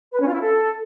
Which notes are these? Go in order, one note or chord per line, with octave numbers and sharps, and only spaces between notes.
B4
C#4
F4
E4
A4